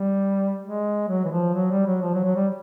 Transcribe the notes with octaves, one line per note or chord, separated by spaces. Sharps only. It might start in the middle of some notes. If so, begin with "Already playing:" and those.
Already playing: G3
G#3
F#3
E3
F3
F#3
G3
F#3
F3
F#3
F#3
G3